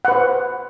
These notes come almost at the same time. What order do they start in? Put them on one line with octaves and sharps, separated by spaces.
F#5 B4 C5